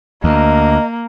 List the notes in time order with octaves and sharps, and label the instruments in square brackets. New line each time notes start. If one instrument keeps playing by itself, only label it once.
[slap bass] D2 [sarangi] A#3 [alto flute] D#5